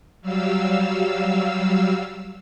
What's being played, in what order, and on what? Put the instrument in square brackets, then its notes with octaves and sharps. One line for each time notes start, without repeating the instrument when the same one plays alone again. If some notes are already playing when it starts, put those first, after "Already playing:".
[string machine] F#3 G3 F5 E6